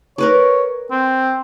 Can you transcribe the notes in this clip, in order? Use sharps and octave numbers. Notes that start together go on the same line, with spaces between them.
A#4 B4 C#5 D5
C4